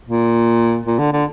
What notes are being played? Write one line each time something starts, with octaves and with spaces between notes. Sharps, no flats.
A#2
A#2
D3
D3